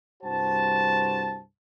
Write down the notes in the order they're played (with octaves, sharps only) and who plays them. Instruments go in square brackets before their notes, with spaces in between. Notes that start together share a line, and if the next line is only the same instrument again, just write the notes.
[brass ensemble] C2 G2 F#4 C5 A5